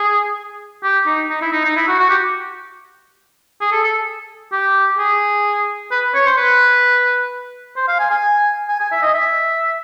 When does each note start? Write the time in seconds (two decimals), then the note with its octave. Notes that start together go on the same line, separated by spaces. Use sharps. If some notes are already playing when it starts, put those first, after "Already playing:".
Already playing: G#4
0.83 G4
1.06 D#4
1.30 D#4
1.41 E4
1.52 D#4
1.64 D#4
1.76 E4
1.88 F#4
1.99 F#4
2.09 G4
3.61 G#4
3.72 A4
3.83 A4
4.52 G4
4.98 G#4
5.91 B4
6.14 C#5
6.26 C5
6.37 B4
7.76 C5
7.88 F5
7.99 G#5
8.10 G#5
8.68 G#5
8.80 G#5
8.92 E5
9.02 D#5
9.14 E5